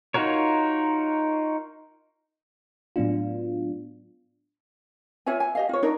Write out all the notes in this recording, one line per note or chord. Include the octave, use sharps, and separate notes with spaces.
D#4 F4 F#4 A#4 C#5
A2 F#3 B3 D4 F4
F4 C#5 E5 G#5
G#5
G4 D#5 F5
F4 C#5
D4 D#4 A#4